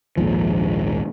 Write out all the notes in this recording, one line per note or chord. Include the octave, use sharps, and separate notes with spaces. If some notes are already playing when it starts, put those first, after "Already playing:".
A#1 D#2 G#2 F3